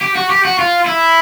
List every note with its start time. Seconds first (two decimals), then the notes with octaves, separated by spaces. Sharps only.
0.02 G4
0.16 F#4
0.30 G4
0.45 F#4
0.59 F4
0.86 E4